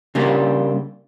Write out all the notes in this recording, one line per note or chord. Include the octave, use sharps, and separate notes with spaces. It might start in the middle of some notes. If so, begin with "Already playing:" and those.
C#3 G3 A#3 D4 G4